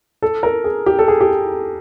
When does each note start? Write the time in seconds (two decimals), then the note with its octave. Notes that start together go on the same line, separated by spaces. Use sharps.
0.22 A4
0.43 A#4
0.64 G#4
0.86 G4
0.99 A4
1.08 G#4
1.20 G4